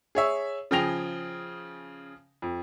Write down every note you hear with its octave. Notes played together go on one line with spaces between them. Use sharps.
G#4 C#5 E5
C#3 F3 G#4 G5 A#6 F7
F2